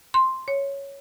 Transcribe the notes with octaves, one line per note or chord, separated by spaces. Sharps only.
C6
C#5